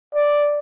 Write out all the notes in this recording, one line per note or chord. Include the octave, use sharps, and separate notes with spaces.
D5